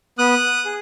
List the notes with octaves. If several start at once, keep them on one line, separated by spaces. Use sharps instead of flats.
B3 D#6 F#6
G#4